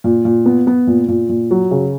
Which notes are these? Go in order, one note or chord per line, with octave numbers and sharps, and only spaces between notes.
A#2
A#2
B3
B3
A#2
A#2
A#2
F#3
C#3